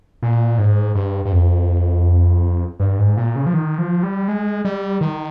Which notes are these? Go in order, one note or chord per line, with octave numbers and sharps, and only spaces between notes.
A#2
G#2
G2
G2
F2
G2
G#2
A#2
C#3
F3
D#3
F3
G3
G#3
G3
D#3